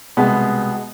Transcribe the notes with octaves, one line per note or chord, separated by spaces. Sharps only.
C2 B2 G#3 B3